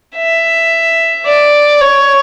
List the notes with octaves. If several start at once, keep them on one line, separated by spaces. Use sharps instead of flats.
E5
D5
C#5